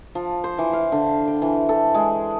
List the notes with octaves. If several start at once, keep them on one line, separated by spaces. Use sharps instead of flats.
F3
C5
E3
F5
D3
G5
E3
A4
G#3